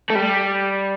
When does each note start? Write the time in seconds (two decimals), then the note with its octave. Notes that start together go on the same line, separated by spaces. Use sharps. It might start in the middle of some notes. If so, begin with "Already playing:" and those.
0.10 A3
0.15 G3